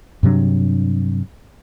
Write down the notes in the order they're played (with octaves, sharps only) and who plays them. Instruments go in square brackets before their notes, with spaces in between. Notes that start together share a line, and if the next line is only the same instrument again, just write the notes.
[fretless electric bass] G2 C3 F#3 D4